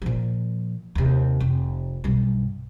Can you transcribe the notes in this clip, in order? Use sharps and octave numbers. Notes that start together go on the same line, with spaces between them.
A#2 F3
D#2 C3
F1
B1 G2